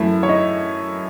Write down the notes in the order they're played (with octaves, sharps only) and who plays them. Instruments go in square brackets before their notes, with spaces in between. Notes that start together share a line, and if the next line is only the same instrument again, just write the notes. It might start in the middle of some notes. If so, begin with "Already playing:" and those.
Already playing: [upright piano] F#2 E3 A3 E4 E5
C#5
D#4 D#5